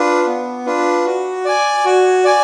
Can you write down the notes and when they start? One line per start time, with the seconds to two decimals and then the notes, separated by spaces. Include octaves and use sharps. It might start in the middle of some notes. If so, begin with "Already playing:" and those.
Already playing: D4 F4 B4
0.27 B3
0.66 D4 F4 B4
1.06 F#4
1.45 D5 G#5
1.85 F#4
2.24 D5 G#5